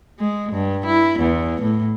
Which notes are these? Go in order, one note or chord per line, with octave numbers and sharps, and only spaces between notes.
G#3
G2
E4
E2
A2